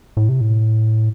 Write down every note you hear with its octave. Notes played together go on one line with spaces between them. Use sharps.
A2
C3
A2